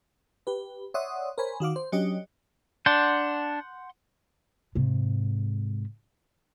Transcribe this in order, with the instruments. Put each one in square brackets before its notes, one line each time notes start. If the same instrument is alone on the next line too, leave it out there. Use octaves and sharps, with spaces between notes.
[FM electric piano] G4 B4
C#5 D5 E5 F#5 C6 D#6
A#4 C5 C#5 G#5 B5
D#3 F#4 F5 D6
C5
F#3 C#4 D4 G4 D#5
[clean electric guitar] D4 [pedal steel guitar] F#5 C6 G6
[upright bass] G#2 C3